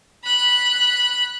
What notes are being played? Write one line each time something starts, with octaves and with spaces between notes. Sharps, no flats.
B5 F#6